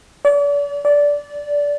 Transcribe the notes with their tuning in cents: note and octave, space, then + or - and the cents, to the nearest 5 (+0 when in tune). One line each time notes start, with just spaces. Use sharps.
D5 -40
D5 -15